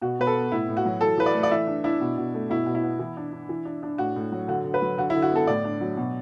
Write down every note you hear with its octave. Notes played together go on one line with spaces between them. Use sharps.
B2 F#4
B2 B4
A4
B3
A2 E4
A2
F#4
F#3
E3 A4
E3 B4
D5
A3
D5
E3 E5
D4
D4 E4
B2
B2
A3
B2 E4
B2
E4
B3
E3
D4
D4
E3
D4
D4
A2 F#4
A2
F#3
D3 F#4
D3
B4
F#3
D3 F#4
E4
D3
F#4
B3 A4
A2 D5
D4
F#3
B2